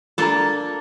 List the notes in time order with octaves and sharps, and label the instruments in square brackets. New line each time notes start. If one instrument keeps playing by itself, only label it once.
[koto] A#3 D4 A4 [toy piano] F4 A#5